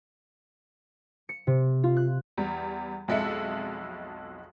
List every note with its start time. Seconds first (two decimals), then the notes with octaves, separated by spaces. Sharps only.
1.29 C#7
1.47 C3
1.83 F4
1.97 F#6
2.37 E2 G3
3.08 B1 F2 G#3 A4 E5 C#7